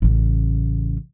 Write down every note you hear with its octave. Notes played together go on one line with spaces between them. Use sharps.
A1 C#3